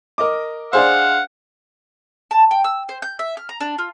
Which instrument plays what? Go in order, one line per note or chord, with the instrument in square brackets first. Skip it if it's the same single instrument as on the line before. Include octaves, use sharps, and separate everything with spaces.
[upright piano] A#4 D#5 D6
[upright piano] D4 G#4 C5 [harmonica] F5 F#5
[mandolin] A5
G5
E6
C5
G6
E5
F6
A#5
D4
F4